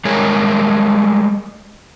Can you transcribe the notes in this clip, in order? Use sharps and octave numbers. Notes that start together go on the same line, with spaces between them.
G3 G#3 G#4 A#4 C#5